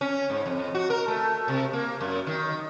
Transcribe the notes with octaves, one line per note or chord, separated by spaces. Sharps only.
C#4
G#2
F2
F#4
A#4
A3
C3
A#3
F#2
D#3